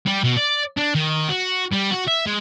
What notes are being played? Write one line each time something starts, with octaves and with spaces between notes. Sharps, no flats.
G3
B2
D5
D4
D#3
F#4
G3
F#4
E5
G#3